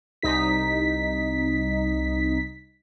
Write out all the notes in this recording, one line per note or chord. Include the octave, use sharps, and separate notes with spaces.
C2 D#4 B6